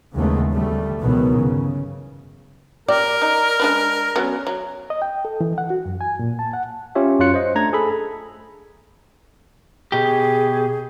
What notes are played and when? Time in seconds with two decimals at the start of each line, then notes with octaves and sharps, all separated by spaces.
0.15 D#2 C#3 E3 G#3 A3 B3
0.53 D2 G3 A3
1.01 C#2 B2 D#3 E3 F#3 B3
1.37 G1 C#3
2.88 G4 A#4 D5
3.22 D#4
3.60 G#3 D4 B4
4.16 F#3 B3 C#4
4.47 F#3
4.90 D#5
5.02 G5
5.25 A4
5.41 E3
5.58 F#5
5.70 F#4
5.86 F#2
6.01 G#5
6.19 A#2
6.39 A5
6.53 F#5
6.95 C#4 F4 G4 C#5 E5
7.19 F#2 F#3 F4 F#6 C#7
7.34 C5 D#5
7.55 A3 D4 A#5 G#6
7.73 G#4 A4 B5
9.92 B2 G4 G#4